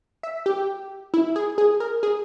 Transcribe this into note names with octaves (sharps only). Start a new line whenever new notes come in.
E5
G4
E4
G#4
G#4
A#4
G#4